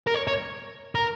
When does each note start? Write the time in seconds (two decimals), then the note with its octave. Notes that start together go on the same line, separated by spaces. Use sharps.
0.07 A#4
0.15 C#5
0.28 C#5
0.95 A#4